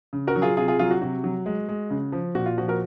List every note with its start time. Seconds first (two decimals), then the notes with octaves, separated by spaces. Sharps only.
0.13 C#3
0.27 F#4 A#4
0.36 F#3
0.42 F4 G#4
0.57 C3 F4 G#4
0.68 F4 G#4
0.79 F#3 F4 G#4
0.91 F#4
1.02 C3 F#4
1.24 F#3
1.46 G#3
1.69 G#3
1.90 C#3
2.12 F3
2.35 A#2 F#4
2.46 F4
2.58 F3 F#4
2.68 F#4 A#4